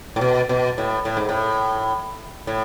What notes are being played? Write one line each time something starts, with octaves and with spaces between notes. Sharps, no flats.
A2
B2
B2
A2
A2
G#2
A2
A2